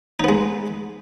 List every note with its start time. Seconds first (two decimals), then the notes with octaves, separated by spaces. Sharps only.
0.20 D#4
0.24 B3
0.29 G#3